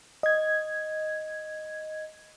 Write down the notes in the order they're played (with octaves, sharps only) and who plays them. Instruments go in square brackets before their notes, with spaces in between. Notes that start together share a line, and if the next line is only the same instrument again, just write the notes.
[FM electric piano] D#5 G#6